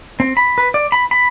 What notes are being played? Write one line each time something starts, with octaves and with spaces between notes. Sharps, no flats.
C4
B5
B4
D5
B5
B5